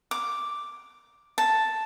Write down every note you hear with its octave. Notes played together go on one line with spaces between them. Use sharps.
D6
A5